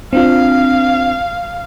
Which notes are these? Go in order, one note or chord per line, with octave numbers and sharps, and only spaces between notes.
C4 D4 F4 F5